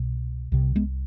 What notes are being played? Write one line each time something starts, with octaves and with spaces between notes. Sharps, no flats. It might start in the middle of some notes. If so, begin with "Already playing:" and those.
Already playing: C2 B2
C2 C3
G#3 B3